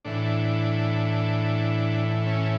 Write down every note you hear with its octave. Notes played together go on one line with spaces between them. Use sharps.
A2 E3 D4
C#4